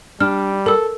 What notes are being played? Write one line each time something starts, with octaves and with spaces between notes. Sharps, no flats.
G3 D4 F6
A4 A#4 E6